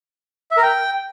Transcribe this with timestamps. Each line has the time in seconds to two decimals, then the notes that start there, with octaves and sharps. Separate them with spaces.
0.51 E5
0.57 A#4
0.63 G5